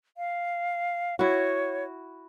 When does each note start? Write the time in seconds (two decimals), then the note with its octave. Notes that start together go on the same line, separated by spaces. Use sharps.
0.17 F5
1.19 E4 F#4 C#5